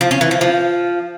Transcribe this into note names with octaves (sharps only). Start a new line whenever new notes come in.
F3
C#4
E3
F3
F3